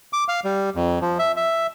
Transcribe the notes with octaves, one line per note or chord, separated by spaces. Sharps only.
D6
F5
G3
F2
F3
E5
E5